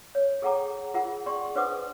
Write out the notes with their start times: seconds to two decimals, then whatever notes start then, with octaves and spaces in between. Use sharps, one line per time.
0.15 C#5
0.42 G#4 A4 F#5 G5 A#5 D6
0.94 F4 G#4 A#4 F#5
1.26 G#4 D5 G5 C6 C#6
1.55 D4 B4 C5 F#5 D6 D#6